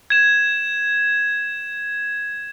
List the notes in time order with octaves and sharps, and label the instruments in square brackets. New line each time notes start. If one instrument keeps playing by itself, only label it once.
[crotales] G#6 E7